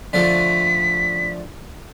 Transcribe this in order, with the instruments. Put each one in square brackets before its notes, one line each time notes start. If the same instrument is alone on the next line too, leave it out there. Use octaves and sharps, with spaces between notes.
[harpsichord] D3 F3 A3 [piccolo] B6